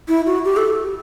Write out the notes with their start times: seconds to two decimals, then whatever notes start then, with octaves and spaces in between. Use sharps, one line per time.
0.08 E4
0.26 F#4
0.45 G4
0.57 A4